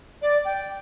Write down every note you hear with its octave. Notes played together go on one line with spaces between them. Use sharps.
D5
G5